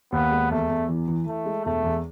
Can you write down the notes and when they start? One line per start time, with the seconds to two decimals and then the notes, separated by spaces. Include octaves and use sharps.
0.12 D#2 B3
0.32 G#3
0.51 E2 A3
0.70 E2
0.89 E3
1.08 E3
1.27 E3 A3
1.45 G#3
1.65 E1 A3
1.84 E2